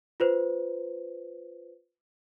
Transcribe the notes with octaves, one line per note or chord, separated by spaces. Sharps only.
F4 B4 C5